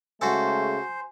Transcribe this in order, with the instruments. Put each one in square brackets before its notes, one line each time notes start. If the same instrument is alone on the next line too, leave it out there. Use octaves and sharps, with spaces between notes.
[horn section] C#3 G#3 A3 [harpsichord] F#4 A4 [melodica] C5 [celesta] G#5